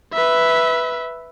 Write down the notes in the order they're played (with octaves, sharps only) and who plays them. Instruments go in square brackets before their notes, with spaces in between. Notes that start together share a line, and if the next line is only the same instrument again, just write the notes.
[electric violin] B4 E5